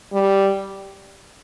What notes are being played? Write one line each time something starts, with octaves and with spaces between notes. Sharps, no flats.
G3